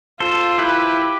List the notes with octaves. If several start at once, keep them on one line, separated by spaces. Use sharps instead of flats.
F4 A4 C5
E4 G4 B4